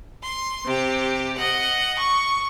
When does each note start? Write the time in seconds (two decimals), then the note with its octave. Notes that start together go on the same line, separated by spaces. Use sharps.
0.23 C6
0.65 C3 G4
1.37 D#5 F#5
1.98 C#6